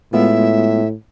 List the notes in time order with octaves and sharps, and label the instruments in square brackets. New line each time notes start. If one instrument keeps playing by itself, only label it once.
[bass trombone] A2 [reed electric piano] G#3 B3 F4 [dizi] E5